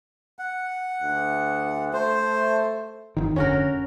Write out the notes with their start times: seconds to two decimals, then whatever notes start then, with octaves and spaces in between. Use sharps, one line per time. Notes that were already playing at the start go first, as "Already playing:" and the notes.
0.39 F#5
1.02 D2
1.93 A3 C5
3.17 G1 D#3
3.36 F1 D3 C#4 F#4 A#4